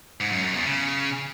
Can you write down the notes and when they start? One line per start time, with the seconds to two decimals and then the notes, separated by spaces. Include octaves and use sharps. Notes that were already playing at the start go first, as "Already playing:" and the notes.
0.21 G#2
0.32 F#2
0.43 F#2
0.54 E2
0.65 C#3